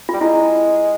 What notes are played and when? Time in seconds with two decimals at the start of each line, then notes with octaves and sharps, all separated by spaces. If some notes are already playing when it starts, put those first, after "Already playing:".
0.09 G3 F4
0.21 G#3 E4